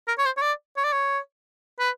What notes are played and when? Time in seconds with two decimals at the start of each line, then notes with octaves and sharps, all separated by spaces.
0.08 A#4
0.18 C#5
0.25 C5
0.37 C#5
0.42 D5
0.77 C#5
0.84 D5
0.92 C#5
1.79 B4